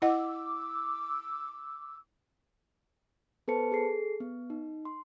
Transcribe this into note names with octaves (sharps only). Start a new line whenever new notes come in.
E4 D#5 F#5 D6 E6
B3 A4 B4 C5 A5 C#7
G#4 A4 C7
B3
D#4
C6